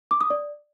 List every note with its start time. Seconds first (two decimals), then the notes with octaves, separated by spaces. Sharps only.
0.11 D6
0.21 D#6
0.30 D5